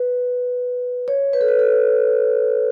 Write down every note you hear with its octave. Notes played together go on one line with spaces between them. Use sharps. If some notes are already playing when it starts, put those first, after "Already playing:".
Already playing: B4
C#5
B4
A4
B4
A4